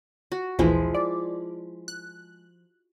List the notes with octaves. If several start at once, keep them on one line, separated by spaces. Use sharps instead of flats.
F#4
A#1 D#2 E3 F3 G#3 E4
D5
F#6